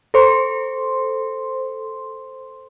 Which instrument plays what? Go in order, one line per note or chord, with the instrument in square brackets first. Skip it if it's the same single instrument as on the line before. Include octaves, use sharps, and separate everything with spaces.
[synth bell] A4 C5 C6